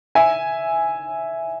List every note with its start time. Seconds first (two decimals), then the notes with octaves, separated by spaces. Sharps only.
0.15 E5 G#5